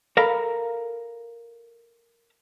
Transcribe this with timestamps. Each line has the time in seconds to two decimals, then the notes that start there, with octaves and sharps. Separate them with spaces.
0.17 A4 A#4 F5 A#5 B5